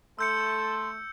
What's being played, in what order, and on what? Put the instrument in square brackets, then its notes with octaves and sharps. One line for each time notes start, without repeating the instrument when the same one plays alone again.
[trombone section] A3 A4 [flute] C6 [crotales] E6 G6 C#7